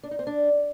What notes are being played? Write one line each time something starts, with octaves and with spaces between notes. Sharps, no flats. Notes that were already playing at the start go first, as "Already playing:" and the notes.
D4
D#4
C4
D4